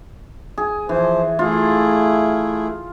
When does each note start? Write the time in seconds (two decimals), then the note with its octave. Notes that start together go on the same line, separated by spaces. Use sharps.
0.58 G#4
0.89 E3 F3 C5
1.39 A3 E4 F4 G#4